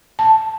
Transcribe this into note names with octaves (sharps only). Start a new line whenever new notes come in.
A5